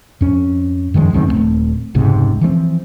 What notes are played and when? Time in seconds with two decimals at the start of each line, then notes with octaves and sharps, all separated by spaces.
0.21 F2 C#4
0.94 F#2 D#3 F3 G#3
1.13 C#2 F#2 D#3 C4
1.27 D#1 E2 A3 C4
1.95 F1 C#2 G#2 C3
2.41 E3 F3 A3 C4